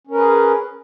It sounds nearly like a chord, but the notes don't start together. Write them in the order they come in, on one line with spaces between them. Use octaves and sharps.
C#4 A#4 B4 G#4